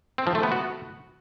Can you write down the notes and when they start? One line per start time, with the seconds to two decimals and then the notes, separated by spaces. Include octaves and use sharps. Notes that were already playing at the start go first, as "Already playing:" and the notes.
0.18 C4
0.27 F3
0.35 A3
0.43 B3
0.52 F#4